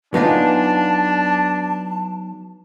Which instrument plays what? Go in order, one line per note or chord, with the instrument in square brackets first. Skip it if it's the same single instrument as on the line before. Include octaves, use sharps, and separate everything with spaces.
[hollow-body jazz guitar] F#3 D#4 F4 [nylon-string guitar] B3 D5 G#5 [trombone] D4 [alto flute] A5